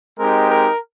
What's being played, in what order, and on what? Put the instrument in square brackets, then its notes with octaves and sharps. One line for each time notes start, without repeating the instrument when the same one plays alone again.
[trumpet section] G#3 C4 D#4 G4 A#4
A#4